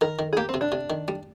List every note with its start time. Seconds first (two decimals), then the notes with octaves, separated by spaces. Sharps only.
0.01 D#3 A#4
0.19 D#3
0.33 G#4
0.37 A#3 G4
0.49 C4
0.54 C3
0.61 D4
0.72 C3
0.90 D#3
1.08 G3